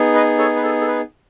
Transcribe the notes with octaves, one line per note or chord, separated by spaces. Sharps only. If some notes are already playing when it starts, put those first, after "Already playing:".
Already playing: B3 D#4 G#4
B4 D#5
A4 C#5
B4
A4
A4
B4